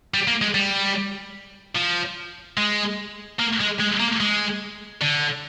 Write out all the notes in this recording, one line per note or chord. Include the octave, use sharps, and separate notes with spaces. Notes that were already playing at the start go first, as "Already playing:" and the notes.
G3
A#3
G#3
G3
F3
G#3
A#3
G#3
G#3
A#3
G#3
D3